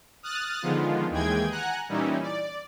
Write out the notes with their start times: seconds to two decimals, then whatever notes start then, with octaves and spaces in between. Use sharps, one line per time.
0.23 D#6 F6 F#6 A6
0.62 D3 D#3 F3 G#3 B3 F4
1.10 D#2 E3 G#3 G#4 G5 G#6
1.51 F#5 G#5 A#5 F#6
1.89 A#2 E3 G3 C#4 D#4 E4
2.22 D5